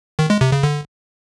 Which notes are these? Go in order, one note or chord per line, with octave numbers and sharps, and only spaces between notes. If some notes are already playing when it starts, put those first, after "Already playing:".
D#3
G#3
C3
C#3
D3